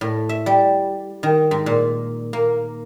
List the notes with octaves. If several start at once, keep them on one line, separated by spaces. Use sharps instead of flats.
A2
E5
G3
D#3
G#2
A#2
A#3